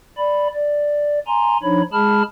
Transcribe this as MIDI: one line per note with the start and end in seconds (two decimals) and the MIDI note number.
0.18 0.48 74
0.18 0.48 83
0.54 1.19 74
1.27 1.57 80
1.27 1.57 82
1.27 1.57 84
1.63 1.82 53
1.63 1.82 62
1.63 1.82 63
1.63 1.82 73
1.63 1.82 83
1.93 2.23 56
1.93 2.23 68
1.93 2.23 81
1.93 2.23 83
1.93 2.23 89